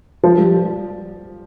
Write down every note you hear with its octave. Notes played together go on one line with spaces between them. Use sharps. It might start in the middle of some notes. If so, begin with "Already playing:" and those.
F3
G3